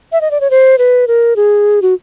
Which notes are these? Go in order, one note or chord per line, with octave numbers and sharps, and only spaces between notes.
E5
D#5
D5
C#5
C5
B4
A#4
G#4
F#4